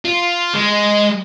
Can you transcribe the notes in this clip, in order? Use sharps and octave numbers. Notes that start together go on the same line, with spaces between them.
F4
G#3